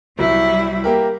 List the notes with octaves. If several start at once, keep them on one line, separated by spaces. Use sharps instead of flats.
C2 F#3 G3 E4
A#3 G4 A#4